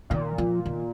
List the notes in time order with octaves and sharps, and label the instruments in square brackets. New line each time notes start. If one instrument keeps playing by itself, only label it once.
[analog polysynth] A#2 [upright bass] D#3
[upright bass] F3
D#3